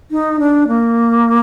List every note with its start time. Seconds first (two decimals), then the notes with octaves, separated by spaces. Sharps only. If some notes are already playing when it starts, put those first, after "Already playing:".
0.11 D#4
0.39 D4
0.68 A#3